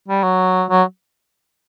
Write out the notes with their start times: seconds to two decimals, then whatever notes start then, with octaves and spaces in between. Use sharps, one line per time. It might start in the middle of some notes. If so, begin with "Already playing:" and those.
0.08 G3
0.23 F#3
0.69 F#3